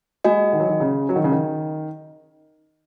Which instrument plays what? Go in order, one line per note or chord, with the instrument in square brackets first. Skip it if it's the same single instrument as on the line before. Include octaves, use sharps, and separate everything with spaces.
[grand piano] G#3 [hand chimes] F#4 D#5 G#5
[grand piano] D#3
F#3
D#3
C#3
F#3
D#3
C#3
D#3